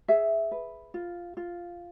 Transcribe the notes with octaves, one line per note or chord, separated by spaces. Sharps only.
G#4 E5
B4
F4
F4